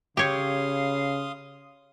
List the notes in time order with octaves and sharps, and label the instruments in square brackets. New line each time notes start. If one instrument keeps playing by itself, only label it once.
[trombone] C#3 [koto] G4 C#5 [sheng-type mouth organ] F5 C6 D#6